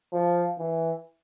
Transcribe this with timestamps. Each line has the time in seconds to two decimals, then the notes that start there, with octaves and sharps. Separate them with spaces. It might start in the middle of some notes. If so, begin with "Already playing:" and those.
0.13 F3
0.59 E3